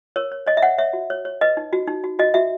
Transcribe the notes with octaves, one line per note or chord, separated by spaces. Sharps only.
A#4 C#5
C#5
C#5 D#5
E5
C#5 F#5
C#5 E5
F#4
C#5
C#5
B4 D#5
D#4
F#4
D#4
F#4
F#4 D#5
F#4 E5